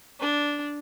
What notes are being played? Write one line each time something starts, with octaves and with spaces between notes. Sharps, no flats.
D4